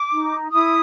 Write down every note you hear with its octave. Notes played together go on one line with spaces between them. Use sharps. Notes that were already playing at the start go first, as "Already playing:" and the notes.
Already playing: D6
D#4
E4 D#6